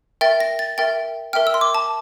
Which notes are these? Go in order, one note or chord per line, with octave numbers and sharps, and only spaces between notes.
A#4 E5 G5 A6
A#6
A6
A#4 E5 G5 A6
A#4 E5 G5 F6
E6
C6
D6
A5